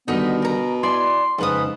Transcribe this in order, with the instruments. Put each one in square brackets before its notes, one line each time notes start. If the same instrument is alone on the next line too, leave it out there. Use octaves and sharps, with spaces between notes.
[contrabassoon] B2 [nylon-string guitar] D3 D#3 G3 [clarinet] B3 [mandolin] D#4 D#5 E5
[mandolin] A#4 A#5
[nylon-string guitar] E4 [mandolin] D5 G#5 [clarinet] C6
[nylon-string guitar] F2 C#3 [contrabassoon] G#2 [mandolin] A4 B4 D#6